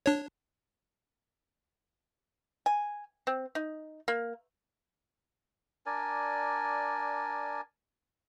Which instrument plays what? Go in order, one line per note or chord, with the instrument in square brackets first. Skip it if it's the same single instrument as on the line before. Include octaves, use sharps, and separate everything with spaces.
[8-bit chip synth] D4 C#5
[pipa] G#5
C4
D#4
A#3
[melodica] D4 A#4 D5 G#5